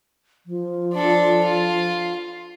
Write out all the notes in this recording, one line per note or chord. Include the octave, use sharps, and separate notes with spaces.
F3
D4 A4
F4